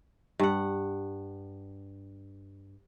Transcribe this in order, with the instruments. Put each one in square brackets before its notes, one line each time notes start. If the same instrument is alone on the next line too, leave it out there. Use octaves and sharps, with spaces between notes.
[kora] G2 F#5